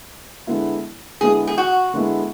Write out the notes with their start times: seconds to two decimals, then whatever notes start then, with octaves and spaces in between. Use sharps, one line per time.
0.47 D3 G#3 B3 E4
1.21 D3 G#3 B3 E4 G#4
1.47 G#4
1.58 F#4
1.94 D3 G#3 B3 E4